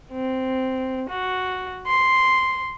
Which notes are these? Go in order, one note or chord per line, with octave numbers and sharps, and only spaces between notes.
C4
F#4
C6